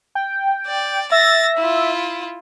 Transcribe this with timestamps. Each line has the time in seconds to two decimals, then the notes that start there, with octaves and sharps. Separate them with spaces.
0.15 G5
0.66 D5
1.12 E5 A6 A#6
1.57 E4 F4